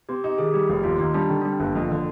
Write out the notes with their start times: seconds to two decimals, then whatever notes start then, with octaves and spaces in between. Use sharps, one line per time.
0.09 C4 G4
0.24 D#4 G4
0.38 D#3 G#4
0.54 G3 G4
0.70 F1 G4
0.84 D#2 F4
0.99 D#3 D#4
1.14 G3 D4
1.29 D3 C4
1.42 G3 D4
1.52 C4
1.60 G1 A#3
1.75 F2
1.90 D3